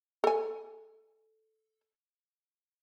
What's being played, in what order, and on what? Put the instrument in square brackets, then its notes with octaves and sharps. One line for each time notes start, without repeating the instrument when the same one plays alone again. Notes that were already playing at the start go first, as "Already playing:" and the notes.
[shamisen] A4 G#5